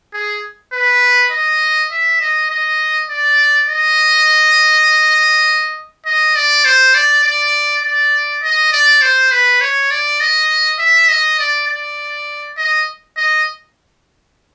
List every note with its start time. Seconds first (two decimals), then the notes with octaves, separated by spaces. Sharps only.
0.13 G#4
0.73 B4
1.32 D#5
1.91 E5
2.21 D#5
2.50 D#5
3.10 D5
3.69 D#5
6.06 D#5
6.36 D5
6.65 C5
6.95 D5
7.24 D5
7.84 D5
8.43 D#5
8.72 D5
9.02 C5
9.31 B4
9.61 C#5
9.91 D5
10.20 D#5
10.79 E5
11.09 D#5
11.39 D5
11.68 D5
12.57 D#5
13.17 D#5